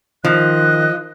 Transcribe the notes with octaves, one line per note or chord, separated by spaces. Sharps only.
D#3 F3 D#5 F#6